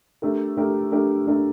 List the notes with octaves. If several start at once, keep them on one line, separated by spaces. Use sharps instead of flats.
A3 D4 G4 A#4
A3 D4 G4 A#4
A3 D4 G4 A#4
A3 D4 G4 A#4